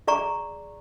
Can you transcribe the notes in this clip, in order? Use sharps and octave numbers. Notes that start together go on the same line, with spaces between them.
G#4 D5 A#5 C#6